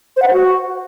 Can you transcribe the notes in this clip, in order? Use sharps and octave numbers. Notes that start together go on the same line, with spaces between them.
C5
F#5
C5
F#4